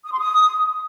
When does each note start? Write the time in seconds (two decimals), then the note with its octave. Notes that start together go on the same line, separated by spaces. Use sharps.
0.05 D#6
0.12 C6
0.19 D#6